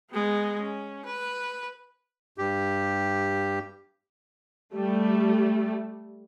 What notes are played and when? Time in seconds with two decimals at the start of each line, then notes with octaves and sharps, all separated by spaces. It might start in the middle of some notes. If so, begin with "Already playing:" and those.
0.11 G#3 B3
0.61 C#4
1.06 B4
2.38 G2 G4
4.74 G3 A3